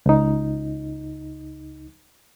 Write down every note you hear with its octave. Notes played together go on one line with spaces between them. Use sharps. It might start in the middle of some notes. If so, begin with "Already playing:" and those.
C#2 D#4